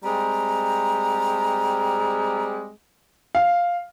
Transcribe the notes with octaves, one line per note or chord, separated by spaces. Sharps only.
G3 G#3 C4 A#5
F5